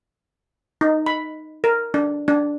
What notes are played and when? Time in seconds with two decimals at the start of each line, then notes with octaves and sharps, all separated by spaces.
0.81 D#4
1.06 B5
1.64 A#4
1.94 D4
2.28 D4